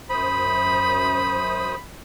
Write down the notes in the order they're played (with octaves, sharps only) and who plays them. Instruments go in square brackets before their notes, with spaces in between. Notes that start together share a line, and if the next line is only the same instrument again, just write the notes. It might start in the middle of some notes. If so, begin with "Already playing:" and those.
[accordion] F#2 C5 D#6 [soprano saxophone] B5